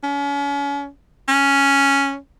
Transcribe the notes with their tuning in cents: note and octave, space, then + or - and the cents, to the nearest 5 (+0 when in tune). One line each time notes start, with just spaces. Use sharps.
C#4 +35
C#4 +0